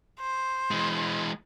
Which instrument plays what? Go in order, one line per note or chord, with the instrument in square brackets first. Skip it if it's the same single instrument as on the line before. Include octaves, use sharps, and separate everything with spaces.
[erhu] C5
[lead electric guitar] E3 G#3